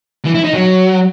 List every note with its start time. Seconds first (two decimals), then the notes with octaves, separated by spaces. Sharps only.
0.25 E3
0.35 E4
0.44 D#4
0.54 F#3